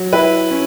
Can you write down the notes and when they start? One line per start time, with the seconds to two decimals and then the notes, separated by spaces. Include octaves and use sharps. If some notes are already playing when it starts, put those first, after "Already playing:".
Already playing: F#3
0.13 E4 B4
0.50 C#4